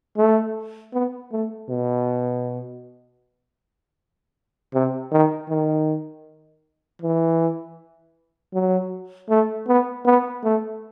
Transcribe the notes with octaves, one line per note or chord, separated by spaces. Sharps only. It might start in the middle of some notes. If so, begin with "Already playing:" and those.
A3
B3
A3
B2
C3
D#3
D#3
E3
F#3
A3
B3
B3
A3